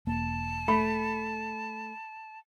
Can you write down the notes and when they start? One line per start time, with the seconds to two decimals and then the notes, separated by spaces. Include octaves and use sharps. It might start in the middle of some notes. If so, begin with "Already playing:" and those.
0.07 E1 A#3 A5
0.68 A3 B5